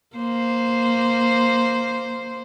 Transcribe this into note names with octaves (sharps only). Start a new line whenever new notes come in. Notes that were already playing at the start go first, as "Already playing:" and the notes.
A#3 C5